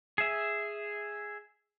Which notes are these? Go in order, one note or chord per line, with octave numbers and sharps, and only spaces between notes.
G#4 E5